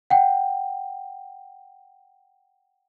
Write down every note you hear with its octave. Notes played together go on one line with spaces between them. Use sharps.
F#5 G5